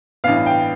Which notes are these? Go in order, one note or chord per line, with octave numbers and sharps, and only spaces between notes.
A1 G2 E3 B3 F5
G5